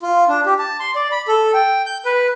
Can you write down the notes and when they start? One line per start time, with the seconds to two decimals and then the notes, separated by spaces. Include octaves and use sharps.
0.02 F4
0.28 D4
0.46 G4
0.59 A5
0.80 C6
0.96 D5
1.12 B5
1.28 A4
1.54 G5
1.86 G6
2.05 B4